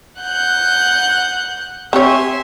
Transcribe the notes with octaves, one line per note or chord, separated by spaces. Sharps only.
F#5 F#6 G6
C4 G4 C#5 E5 G#5 C6